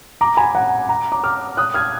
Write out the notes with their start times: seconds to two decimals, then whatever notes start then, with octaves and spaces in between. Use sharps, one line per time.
0.21 A#5 D6
0.37 G#5 B5
0.55 F#5 A#5
0.89 F#5 A#5
1.12 A#5 D6
1.23 D6 F6
1.57 D#6 F#6
1.74 F6 G#6